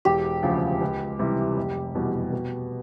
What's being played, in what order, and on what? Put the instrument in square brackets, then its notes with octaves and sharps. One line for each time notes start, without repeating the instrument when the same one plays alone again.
[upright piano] E1 [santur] G4
[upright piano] D2 C#3 F3
C#2
C3 E3 G3
F1
E2 B2 G3
B2